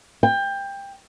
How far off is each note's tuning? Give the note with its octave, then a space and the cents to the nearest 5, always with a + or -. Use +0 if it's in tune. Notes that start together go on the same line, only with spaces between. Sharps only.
G5 +20